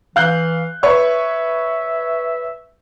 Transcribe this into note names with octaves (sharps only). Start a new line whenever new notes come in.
E3 F5 F#6 G6
B4 C#5 E5 C#6